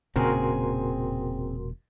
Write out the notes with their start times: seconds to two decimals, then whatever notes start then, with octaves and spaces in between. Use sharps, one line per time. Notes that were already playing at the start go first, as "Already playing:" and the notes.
0.16 E1 A#2 C#3 C4 F#4 G#4 A#4 C6